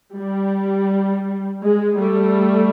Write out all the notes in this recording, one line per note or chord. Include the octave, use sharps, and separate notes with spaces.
G3
G#3
G3 A3